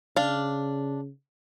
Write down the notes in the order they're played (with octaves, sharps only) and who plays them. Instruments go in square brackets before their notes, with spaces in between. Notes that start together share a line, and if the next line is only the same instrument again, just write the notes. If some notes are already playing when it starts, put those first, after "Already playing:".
[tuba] C#3 [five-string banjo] D4 F5